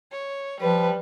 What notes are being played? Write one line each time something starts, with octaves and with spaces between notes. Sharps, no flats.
C#5
F3 G3 B4